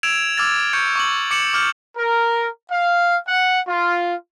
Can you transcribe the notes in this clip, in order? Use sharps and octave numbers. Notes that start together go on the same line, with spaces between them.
E6 G#6 D7 E7 F7
D6 E6 F6 G#6 A6
C#6 G6 C#7
C#6 D6 F#7
D6 C#7 E7 F#7
D6 F6 G6 C#7
A#4
F5
F#5
F4